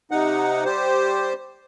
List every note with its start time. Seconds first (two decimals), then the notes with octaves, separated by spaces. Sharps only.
0.11 C3 D#4 F#5
0.65 G3 G4 C5